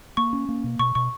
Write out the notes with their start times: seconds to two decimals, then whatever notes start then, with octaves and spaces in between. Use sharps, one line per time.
0.17 A#3 C#6
0.33 C#4
0.49 A#3
0.64 B2
0.79 B2 C#6
0.95 B2 C#6